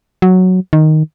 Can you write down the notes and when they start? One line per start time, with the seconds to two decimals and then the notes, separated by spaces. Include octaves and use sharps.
0.22 F#3
0.73 D#3